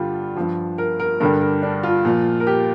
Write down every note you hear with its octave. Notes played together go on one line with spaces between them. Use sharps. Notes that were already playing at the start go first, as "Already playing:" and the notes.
Already playing: G2 D3 G3 D4 F4
G2 F3
A#4
A#4
G2 D3 G3 A#4
A#4
D4
F4
A#2 F3
A#4
G4